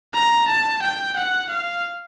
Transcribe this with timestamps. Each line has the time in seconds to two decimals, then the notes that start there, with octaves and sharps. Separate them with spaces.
0.14 A#5
0.48 A5
0.82 G5
1.16 F#5
1.49 F5